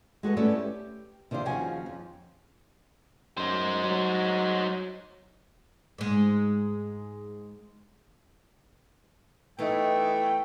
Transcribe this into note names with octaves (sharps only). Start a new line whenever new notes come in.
G#3 F#4 A4 B4
A3 B3 C#4 E4 A4 D5
G4
C3 D#3 D4 F4 C5
D#2 C#3 F3 F#4 G#5
F2
F#2 D#4 C5
F#3
G#2 G#3
E3 A3 B3 D#4 B4 G5